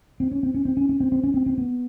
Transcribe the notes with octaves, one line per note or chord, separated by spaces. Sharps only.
C4
C#4
C4
C#4
C4
C#4
C#4
C4
C4
C#4
C4
C4
B3